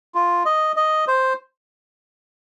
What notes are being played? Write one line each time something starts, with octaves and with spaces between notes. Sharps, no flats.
F4
D#5
D#5
C5